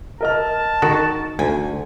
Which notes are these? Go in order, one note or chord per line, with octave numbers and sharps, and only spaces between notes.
A#4 D#5 A5 F6
D#3 F#4
D2 G#5